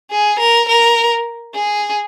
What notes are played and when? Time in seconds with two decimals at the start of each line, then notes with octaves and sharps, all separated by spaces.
0.11 G#4
0.39 A#4
0.68 A#4
1.54 G#4